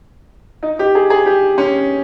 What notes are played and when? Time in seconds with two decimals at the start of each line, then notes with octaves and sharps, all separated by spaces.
0.63 D#4
0.79 G4
0.95 G#4
1.10 G#4
1.26 G4
1.58 C#4